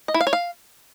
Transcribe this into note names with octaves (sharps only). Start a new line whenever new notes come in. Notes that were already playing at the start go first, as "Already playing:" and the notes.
D#5
E4
F5
C#5
F5